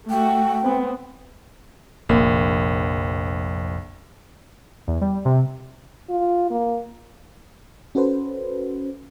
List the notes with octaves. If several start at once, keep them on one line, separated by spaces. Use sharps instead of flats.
A3 F#4 G5
B3 C4
F1 A#1 A#3 C4
E2
G3
C3
F4
A#3
C#4 F#4 A4 B4 C5